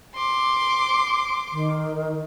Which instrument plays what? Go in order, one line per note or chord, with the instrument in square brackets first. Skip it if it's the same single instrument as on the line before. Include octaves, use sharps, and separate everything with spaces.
[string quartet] C6 D6
[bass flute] D#3